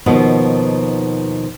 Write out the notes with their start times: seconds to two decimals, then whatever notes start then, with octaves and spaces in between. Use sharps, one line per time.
0.06 D#2 B2 D#3 F3 B3